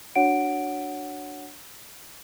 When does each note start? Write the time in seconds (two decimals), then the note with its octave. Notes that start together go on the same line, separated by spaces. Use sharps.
0.15 D4 F#4 C#5 F#5 D7